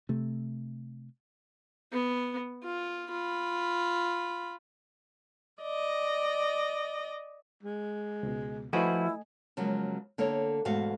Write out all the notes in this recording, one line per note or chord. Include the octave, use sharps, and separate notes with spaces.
C3 A3
B3
F4
F4 B5
D5 D#5
G#3
C#2 B2
F3 A3 E4 F#4 B4 D#5 G#5
C#3 F3 F#3 G#3 A#3
D3 A#3 A4 C#5
E2 G#2 B2 A3 F#4 F5